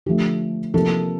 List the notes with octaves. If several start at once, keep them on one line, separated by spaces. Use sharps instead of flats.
D3 F3 A3 G4
C3 F3 A#3 A4